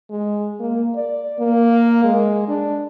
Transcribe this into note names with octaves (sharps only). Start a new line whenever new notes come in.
G#3
A#3
D5
A#3
G#3
D4